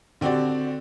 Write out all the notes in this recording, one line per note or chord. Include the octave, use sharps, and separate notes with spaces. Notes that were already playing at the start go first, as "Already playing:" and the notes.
D3 C4 F#4 G4 D5